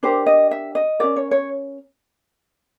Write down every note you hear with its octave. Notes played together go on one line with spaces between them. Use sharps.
D4 G4 A#4 C5
D#5
E5
D#5
C#4 F#4 A#4 D5
C#5
C#5